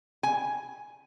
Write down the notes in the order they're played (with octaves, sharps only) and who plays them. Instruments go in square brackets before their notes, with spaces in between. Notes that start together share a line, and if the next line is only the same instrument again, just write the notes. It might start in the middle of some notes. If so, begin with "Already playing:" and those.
[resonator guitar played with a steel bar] G#5